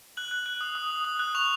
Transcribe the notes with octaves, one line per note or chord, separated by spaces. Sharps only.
F#6 F#7
F#6
F#6
D#6
D#6
D#6
D#6
F#6
C#6 F7